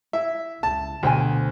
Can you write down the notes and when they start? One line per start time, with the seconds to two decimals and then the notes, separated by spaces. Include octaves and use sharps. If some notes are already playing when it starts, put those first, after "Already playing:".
0.13 E4 E5
0.63 C#2 A5
1.03 D2 B2 C5 G5 G#5